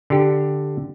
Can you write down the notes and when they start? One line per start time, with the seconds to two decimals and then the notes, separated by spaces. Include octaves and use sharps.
0.10 D3 G4